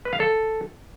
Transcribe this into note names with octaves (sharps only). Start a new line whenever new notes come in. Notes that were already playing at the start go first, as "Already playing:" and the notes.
B4
F5
A4